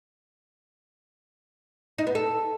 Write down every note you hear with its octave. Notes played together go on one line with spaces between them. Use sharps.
D#4
B3
A4